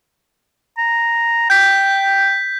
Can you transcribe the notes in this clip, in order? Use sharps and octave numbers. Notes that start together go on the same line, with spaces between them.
A#5
G5 G6 B6